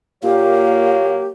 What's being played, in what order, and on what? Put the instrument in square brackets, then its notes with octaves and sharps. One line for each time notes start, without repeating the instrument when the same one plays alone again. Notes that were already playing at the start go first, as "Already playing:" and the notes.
[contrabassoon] A#2 [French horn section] F#3 A#3 C#5 [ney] G4 [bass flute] F5